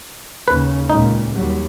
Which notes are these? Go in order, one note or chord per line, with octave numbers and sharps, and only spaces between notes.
D#2 C#3 B4
C#2 A#2 D#4
D#2 F#3 G3